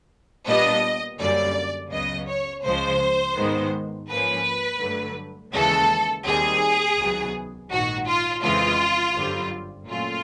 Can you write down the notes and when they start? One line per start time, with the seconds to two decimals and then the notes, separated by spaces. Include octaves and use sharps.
0.47 A#2 G3 B3 D4 D#5
1.19 F#2 D3 G3 A#3 C#4 D5
1.91 C#2 C#3 F#3 B3 D#5
2.28 C#5
2.63 C#2 C#3 F3 G#3 C5
3.36 G#2 D#3 G#3 B3
4.09 G#2 F3 A#3 C#4 B4
4.81 G2 D3 F#3 A3
5.54 D#2 C#3 E3 G#3 A4
6.25 D#2 D#3 G3 C4 G#4
6.98 C#2 C3 D#3 F#3 B3
7.70 A#1 G#2 D#3 F#4
8.07 F4
8.43 F2 C#3 E3 G#3 C4 F4
9.15 G1 F#2 D3 G3 C4
9.88 A#2 F#3 A3 C#4 F4